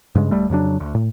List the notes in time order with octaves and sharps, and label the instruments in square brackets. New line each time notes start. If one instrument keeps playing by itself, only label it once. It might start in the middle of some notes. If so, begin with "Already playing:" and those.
[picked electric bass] G2 C#3 G#3
D1 G3 A3
F2 C#3 F#3 D4
D2
A2